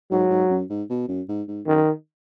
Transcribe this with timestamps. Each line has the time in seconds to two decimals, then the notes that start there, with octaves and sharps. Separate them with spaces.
0.11 G#2 F#3
0.31 G#2
0.50 F#2
0.70 G#2
0.90 B2
1.08 F#2
1.29 G#2
1.48 G#2
1.67 F#2 D#3